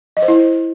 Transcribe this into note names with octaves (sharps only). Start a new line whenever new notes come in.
D#5
C5
E4